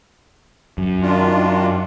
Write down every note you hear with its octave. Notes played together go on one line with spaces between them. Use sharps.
F#2
D#3 D4 F4